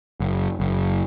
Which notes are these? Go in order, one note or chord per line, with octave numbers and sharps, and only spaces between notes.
F#1
F#1